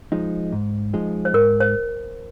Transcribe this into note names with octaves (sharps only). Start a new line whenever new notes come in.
F3 G#3 D#4
G#2
F3 G#3 D#4
C5
G#2 A#4
C5